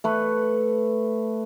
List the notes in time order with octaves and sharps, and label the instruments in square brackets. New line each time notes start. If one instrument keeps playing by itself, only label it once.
[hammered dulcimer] A3 B4